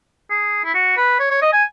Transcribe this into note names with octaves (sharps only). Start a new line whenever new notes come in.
G#4
E4
F#4
B4
C#5
C#5
D#5
G#5